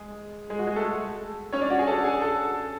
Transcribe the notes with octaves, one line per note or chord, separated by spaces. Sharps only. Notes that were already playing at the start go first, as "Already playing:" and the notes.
Already playing: G#3 G#4
G#3 G#4
F#4
G#3 G#4
A3 A4
C#4 C#5
D4 D5
F#4 F#5
G#4 G#5
A4 A5
G#4 G#5
A4 A5